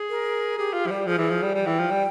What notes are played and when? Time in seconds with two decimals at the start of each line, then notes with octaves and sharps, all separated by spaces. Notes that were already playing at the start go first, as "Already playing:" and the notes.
Already playing: G#4
0.10 A#4
0.58 G4 G#4
0.73 F4
0.87 F3
0.91 G3
1.06 F3 G#4
1.18 E3
1.30 F3
1.43 G3
1.55 G3 G5
1.67 E3
1.80 F3
1.91 G3